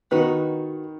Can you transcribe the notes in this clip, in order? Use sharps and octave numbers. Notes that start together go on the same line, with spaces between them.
D#3 B3 D#4 F#4 B4